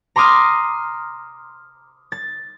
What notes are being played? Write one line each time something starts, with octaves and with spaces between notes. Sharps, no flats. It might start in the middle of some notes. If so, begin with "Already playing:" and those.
A#5 C6 D6 D#6 F6
A6